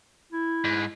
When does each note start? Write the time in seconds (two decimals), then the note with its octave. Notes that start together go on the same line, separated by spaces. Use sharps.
0.32 E4
0.64 G#2